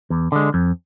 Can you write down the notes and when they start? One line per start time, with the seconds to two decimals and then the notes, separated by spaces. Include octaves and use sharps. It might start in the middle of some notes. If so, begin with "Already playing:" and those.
0.10 E2
0.32 D3 G#3
0.54 F2